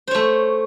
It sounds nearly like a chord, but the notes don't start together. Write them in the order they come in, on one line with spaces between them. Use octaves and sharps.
C5 C#5 A3